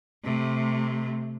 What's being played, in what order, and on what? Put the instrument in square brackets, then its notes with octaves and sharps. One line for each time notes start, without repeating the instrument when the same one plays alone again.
[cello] C3 A3